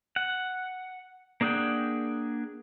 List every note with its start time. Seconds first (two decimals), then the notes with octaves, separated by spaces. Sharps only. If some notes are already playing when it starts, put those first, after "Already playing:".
0.16 F#5
1.41 A#3 D4 G#4 F#5 G5